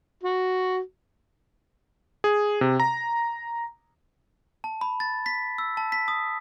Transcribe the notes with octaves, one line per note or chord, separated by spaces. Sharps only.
F#4
G#4
C3
A#5
A5
B5
A6
B6
E6
A5
B6
D#6